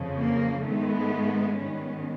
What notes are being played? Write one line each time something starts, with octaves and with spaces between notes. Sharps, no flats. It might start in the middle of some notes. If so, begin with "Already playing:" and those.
Already playing: F2 C#3 F3
A#3
G#2 D#3 G#3 A3 B3
G#2 D#3 G3 B3 C#4